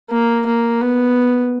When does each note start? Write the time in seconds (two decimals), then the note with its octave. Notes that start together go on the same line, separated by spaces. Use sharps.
0.11 A#3
0.46 A#3
0.81 B3